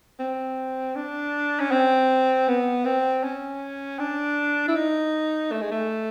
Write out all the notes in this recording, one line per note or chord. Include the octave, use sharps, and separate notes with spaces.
C4
D4
C#4
C4
B3
C4
C#4
D4
E4
D#4
A3
G#3
A3